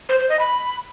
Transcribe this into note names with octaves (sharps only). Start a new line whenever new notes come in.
C5
C5
D#5
B5